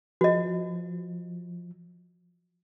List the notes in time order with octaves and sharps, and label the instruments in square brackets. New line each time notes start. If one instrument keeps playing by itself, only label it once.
[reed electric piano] F3 [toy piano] F#4 D#5